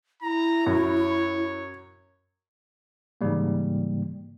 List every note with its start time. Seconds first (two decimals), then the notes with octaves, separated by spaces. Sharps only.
0.22 E4 A#5
0.66 F#2 C#5
3.21 G#2 C#3 E3 G3 A#3